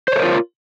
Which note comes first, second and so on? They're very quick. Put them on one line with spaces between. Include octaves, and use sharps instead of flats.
C5 C#5 A4 A#4 F4